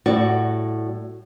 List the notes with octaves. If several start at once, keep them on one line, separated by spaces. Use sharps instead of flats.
A2 G3 F#4 D5